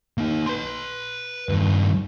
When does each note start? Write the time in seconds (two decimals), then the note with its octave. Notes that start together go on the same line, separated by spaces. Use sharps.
0.18 A#3 D#4
0.46 B4 C6
1.49 G2 D#3